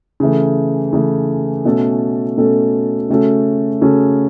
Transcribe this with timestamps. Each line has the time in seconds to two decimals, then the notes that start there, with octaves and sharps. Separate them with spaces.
0.20 C#3 E3 A3
0.93 C#3 E3 A3
1.65 B2 A3 C#4 A4
2.38 B2 A3 C#4 A4
3.10 C#3 A3 C#4 F#4 A4
3.82 C#3 A3 C#4 F#4 A4